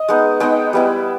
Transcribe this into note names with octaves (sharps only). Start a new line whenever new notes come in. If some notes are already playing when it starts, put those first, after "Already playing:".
Already playing: D#5
G#3 B3 D#4
G#3 B3 D#4 D#5 G5
G3 B3 E4